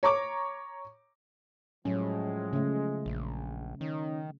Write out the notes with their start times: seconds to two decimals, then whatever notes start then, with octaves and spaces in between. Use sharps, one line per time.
0.03 C#5 A#5 C#6 D6
1.85 A2 F3 F#3 G#3 C#4
2.53 C#3 A3
3.06 A#1
3.81 D#3 C#4 D#4